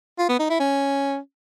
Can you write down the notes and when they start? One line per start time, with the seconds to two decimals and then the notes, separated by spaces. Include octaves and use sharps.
0.19 F4
0.29 B3
0.39 D#4
0.49 E4
0.60 C#4